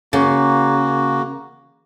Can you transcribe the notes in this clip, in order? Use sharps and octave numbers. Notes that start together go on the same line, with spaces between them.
C#3 A#3 F#4